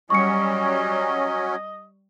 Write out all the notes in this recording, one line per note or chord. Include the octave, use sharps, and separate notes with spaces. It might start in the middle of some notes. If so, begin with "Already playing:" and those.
F#3 G3 C#4 D#5 C#6 C#7